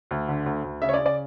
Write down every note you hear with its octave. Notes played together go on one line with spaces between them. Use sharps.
D2
D3
D2
D2
C#3 E5
C#5
D5
C#3
D5